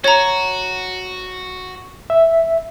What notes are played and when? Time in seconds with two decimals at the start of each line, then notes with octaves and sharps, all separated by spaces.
0.04 F#4 C#5 A#5
2.10 E5